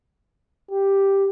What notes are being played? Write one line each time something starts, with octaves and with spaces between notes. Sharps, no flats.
G4